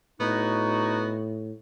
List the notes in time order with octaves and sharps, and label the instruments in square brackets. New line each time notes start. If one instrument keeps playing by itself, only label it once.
[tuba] A2 [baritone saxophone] B3 [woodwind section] D#4 F#4